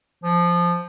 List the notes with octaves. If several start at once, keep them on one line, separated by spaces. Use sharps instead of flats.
F3